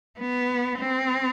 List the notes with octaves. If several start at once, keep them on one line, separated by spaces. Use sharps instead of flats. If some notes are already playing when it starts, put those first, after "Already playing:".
B3
C4